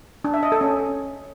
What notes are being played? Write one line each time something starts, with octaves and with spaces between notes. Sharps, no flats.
D4
E5
D#5
A4
C#4